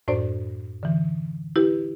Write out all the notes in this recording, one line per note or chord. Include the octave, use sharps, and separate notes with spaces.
F#2 A2 D4 C5 D5
D3 E3
E4 G4 B4